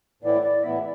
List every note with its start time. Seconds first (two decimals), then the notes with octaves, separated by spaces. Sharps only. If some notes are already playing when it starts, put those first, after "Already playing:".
0.22 A2 E3 B3 E4 D5
0.42 D5
0.63 A2 E3 B3 E4 E5